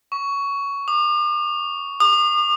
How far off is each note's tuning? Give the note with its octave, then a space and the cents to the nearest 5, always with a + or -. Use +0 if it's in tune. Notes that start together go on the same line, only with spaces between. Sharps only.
C#6 +15
D6 +45
D#6 -45